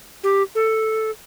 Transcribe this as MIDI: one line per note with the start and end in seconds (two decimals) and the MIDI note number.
0.24 0.43 67
0.55 1.11 69